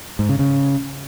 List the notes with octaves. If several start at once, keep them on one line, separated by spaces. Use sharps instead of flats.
G#2
C#3
C#3